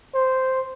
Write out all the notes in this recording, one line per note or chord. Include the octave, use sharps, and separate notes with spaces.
C5